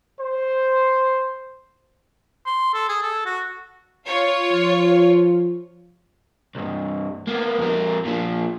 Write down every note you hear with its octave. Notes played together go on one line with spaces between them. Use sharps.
C5
C6
A4
G#4
A4
F#4
F4 C#5
F3
C2 G2
A#3 B3
F2 A#4
A#2 F3